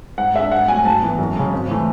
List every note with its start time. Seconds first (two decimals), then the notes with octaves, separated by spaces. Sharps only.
0.18 G#2 F#5
0.34 G#3 D4 E5
0.51 G#2 F#5
0.68 F#3 A3 G#5
0.85 G#2 A5
1.02 E3 B3
1.18 F#2
1.36 C#3 G#3
1.53 G#1
1.71 E3 A3